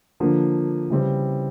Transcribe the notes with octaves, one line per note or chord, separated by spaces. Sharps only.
D3 F3 A#3 D4
C#3 E3 G3 C4